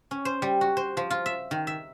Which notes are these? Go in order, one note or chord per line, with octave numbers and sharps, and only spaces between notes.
C#4
C5
G3
F#4
C5
F3
F4
E5
D#3
E5